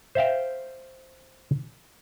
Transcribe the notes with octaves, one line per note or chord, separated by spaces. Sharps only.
C5 E5 F5 G5